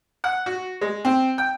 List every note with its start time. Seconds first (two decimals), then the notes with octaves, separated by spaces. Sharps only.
0.24 F#5
0.46 F#4
0.81 G#3
1.05 C4
1.38 G5